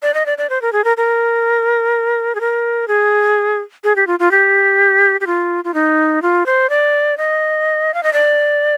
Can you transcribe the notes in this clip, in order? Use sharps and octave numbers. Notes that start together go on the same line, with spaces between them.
D5
D#5
D5
D5
C5
A#4
G#4
A#4
A#4
G#4
A#4
G#4
G#4
G4
F4
F4
G4
G4
F4
F4
D#4
F4
C5
D5
D#5
F5
D#5
D5